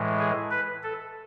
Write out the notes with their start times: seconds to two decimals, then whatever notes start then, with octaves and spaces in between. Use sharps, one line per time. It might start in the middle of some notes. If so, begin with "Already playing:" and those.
Already playing: A2 E3 G#3
0.19 G#4
0.51 B4
0.83 A4